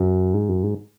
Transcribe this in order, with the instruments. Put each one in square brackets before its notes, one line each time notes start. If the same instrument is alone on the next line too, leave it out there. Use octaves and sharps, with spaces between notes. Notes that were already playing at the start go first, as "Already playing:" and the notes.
Already playing: [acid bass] F#2
G#2
F#2
G#2